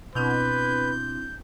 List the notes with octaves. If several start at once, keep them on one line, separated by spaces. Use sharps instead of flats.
B2 C4 D4 E4 B4 G6